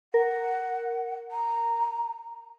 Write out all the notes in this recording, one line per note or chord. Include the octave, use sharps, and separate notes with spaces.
A#4 F#5
A#5